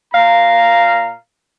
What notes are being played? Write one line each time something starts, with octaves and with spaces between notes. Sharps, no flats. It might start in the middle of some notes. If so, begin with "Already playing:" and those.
A#2 F5 A#5